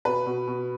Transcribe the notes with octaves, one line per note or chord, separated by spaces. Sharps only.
B2 B4
B2
B2